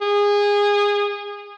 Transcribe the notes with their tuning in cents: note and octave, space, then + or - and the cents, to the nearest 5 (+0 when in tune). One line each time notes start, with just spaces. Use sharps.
G#4 -25